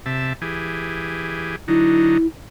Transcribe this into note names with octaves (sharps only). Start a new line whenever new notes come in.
C3 E5 A5
E3 G4 G#4
D3 F#3 D#4 E4